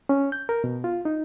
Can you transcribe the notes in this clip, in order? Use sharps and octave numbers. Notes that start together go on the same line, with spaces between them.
C#4
G6
A#4
B2
F4
D#4